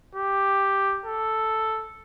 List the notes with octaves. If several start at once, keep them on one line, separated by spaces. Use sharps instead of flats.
G4
A4